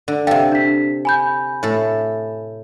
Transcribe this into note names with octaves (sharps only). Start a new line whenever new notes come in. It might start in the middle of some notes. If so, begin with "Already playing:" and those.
D3
C3 A4 F5 G5
D4 B6
G#5 B5 G6
A2 A4